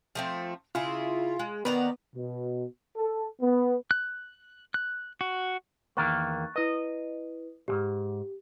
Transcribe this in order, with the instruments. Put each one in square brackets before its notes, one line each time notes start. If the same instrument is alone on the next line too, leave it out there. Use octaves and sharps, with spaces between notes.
[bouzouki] F3 A3 C4
[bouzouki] C#3 E4 G#4 [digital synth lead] F4
[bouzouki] G#3
[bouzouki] D#3 D5 A#5 [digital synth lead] B3
[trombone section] B2
A4
B3
[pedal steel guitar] F#6
F#6
F#4
[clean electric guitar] E2 D#3 A#3 [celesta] C#6 F#6 A6
[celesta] E4 B4 [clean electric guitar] D#5
[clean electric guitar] B1 G#2 [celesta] G4